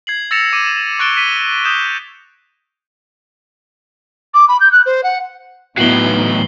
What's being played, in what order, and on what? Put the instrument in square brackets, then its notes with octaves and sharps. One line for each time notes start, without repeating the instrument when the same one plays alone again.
[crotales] G#6 C7 F#7
E6 A6 A#6 C#7 E7 F7
D6 D#7
C#6 F#6 A6 D7 G7
B6 D#7 G7
D#6 G6 E7 G7
[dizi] D6
B5
G6
F#6
C5
F#5
[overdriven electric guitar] A2 F#3 [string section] E3 B3 D#4 [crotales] C7 F#7 G7